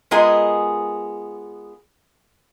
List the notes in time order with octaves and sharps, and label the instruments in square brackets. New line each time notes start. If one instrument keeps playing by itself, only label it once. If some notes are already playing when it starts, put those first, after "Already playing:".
[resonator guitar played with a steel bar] G#3 B3 F4 G#4 A#4 D#5